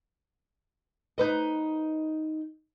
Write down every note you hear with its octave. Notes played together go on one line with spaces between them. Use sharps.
D#4 B4 D#5